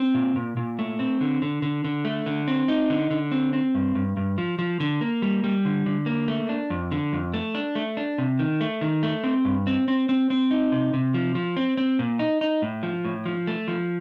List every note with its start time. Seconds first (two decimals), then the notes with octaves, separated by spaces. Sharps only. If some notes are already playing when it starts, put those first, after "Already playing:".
Already playing: C4
0.14 A#2
0.36 A#2
0.57 A#2
0.79 A3
0.99 C4
1.21 D3
1.42 D3
1.62 D3
1.84 D3
2.05 A3
2.26 D3
2.48 C4
2.68 D#4
2.90 D3
3.11 D3
3.32 C4
3.53 C4
3.75 G2
3.95 G2
4.17 G2
4.38 F3
4.59 F3
4.80 D3
5.01 A#3
5.22 G3
5.44 G3
5.65 D3
5.86 D3
6.06 A#3
6.28 A3
6.49 D4
6.70 F2
6.91 D3
7.13 F2
7.34 A3
7.55 D4
7.75 A3
7.97 D4
8.18 C3
8.39 D#3
8.61 A3
8.81 D#3
9.03 A3
9.24 C4
9.45 G2
9.67 C4
9.88 C4
10.09 C4
10.30 C4
10.51 D#4
10.72 C3
10.93 C3
11.14 F3
11.35 F3
11.57 C4
11.77 C4
11.99 A#2
12.19 D#4
12.41 D#4
12.62 A2
12.83 F3
13.05 A2
13.25 F3
13.47 A3
13.68 F3